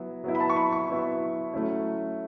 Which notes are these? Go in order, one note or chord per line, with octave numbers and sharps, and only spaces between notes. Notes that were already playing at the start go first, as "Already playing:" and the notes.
Already playing: F#3 B3 E4
F#3 B3 E4
B5
A5
C#6
B5
C#6
F#3 B3 E4
F#3 A3 C#4 E4